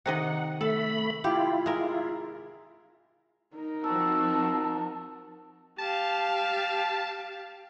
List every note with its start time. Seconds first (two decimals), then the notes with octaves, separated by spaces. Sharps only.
0.06 C3 D#3 D#5 F#5
0.61 A3 A4 B5
1.24 E4 F4 G4
1.66 G#3 A#4
3.56 D#4 A#4
3.84 F3 C4 F#4 A5 E6
5.78 G4 F5 A5